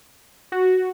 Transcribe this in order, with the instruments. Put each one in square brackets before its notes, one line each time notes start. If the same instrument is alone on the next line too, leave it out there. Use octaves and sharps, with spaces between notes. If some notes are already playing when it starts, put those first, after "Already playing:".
[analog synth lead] F#4